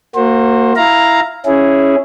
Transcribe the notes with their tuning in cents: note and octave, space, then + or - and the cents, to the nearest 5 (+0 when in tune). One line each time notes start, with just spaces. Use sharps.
A#3 -20 F#4 +0 C5 +20
E4 +0 F5 +0 A#5 +0
C#4 +0 E4 +0 G#4 +0